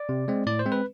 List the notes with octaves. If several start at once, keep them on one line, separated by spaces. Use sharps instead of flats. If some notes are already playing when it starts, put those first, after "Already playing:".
Already playing: D5
C3
G#3 C4
A2 D5
C5
G#3 C4
B4